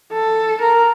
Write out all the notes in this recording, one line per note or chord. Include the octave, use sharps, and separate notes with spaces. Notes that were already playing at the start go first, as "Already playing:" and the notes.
A4
A#4